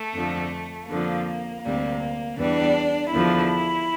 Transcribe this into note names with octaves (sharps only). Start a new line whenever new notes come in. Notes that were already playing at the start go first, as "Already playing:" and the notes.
Already playing: A3
F2 D3 F3
F2 D3 F3 A#3
D2 C3 G3 A#3
E2 E3 G3 D4
E2 D3 F3 E4